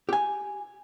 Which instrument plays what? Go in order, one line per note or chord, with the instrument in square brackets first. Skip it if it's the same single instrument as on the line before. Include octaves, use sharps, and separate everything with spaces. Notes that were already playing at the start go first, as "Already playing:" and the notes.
[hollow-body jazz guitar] G4 G#5